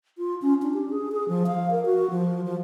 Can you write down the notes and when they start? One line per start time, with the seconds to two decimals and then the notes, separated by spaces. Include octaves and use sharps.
0.18 F4
0.42 C#4
0.62 D4
0.74 G4
0.90 G#4
1.12 G#4
1.28 F3
1.47 F5
1.71 A#4
1.85 F#4
2.10 F3
2.45 F3